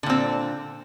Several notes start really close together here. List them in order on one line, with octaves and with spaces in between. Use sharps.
D3 A#2 C4